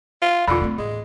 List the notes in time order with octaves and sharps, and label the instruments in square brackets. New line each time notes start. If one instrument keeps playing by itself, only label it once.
[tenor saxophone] F4
[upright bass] B1 E2 [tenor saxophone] D3 [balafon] F4 B5
[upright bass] A3 C4
[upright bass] A1 [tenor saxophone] G#3